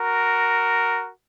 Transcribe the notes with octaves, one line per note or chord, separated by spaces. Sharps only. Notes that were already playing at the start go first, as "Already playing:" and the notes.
Already playing: F#4 A#4